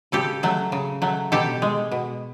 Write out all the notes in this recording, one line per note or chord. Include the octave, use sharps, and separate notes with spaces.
C#3 G4 A4
F#3 A3
C#3
F#3 A3
B2 G4 A4
G#3
B2